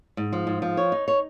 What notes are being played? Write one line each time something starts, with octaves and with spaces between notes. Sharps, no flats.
G#2
F3
G#2
F3
C#5
D#4
C#5